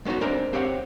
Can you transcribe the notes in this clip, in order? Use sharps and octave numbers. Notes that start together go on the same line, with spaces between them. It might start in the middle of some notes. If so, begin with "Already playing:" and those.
G#3 B3 C#4 D#4 F#4
G#3 C4 D4 D#4 A#4 E5
C4 G4 C#5 F5 F#5